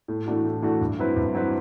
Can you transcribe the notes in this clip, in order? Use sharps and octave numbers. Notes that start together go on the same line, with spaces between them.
A2
E3 A3 D4 F#4
A2
E3 A3 D4 F#4
G2
F#3 C4 E4 B4
G2
F#3 C4 E4 B4